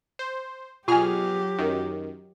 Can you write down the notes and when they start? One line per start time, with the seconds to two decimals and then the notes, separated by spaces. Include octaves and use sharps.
0.19 C5
0.88 B2 F#3 F4 G4 G#4 G#5 F6
1.58 F#2 D#3